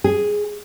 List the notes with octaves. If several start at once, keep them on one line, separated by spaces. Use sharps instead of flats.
G#4